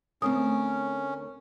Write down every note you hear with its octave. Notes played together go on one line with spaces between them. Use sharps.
D2 A3 C4 C#4 A#4 D#6